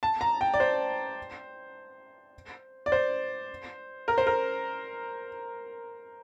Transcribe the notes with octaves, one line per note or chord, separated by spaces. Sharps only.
A5
A#5
G5
D5
C5
D5
C5
A#4
C5
A#4